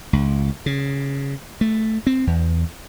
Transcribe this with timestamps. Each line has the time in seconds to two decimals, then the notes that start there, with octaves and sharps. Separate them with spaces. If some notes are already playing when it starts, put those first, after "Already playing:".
0.13 C#2
0.66 C#3
1.61 A3
2.07 C4
2.27 E2